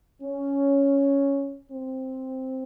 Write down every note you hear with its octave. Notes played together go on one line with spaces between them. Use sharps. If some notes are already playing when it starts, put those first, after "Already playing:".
C#4
C4